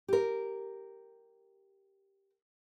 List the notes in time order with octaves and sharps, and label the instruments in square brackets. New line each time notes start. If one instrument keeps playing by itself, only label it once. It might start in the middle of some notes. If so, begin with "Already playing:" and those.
[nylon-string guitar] G4 A#4